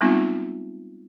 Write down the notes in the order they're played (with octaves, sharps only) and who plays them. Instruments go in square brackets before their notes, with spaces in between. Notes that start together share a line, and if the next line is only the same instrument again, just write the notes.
[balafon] G3 G#3 B3 C4 D#4 F4